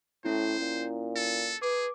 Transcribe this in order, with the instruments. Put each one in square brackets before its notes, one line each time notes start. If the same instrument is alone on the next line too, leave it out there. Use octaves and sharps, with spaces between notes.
[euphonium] A2 [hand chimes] C#4 E4 [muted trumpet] C5
[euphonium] A#2
[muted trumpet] A4
[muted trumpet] G#4 [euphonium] B4 [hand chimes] D6